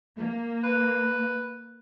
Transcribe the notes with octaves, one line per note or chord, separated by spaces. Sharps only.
A#3
B4